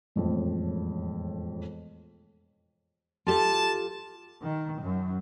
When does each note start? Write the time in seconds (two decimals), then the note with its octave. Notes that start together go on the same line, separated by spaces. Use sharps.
0.16 E1 F2 A2
3.27 F4 G4 A4 A5
4.43 D#3
4.80 F#2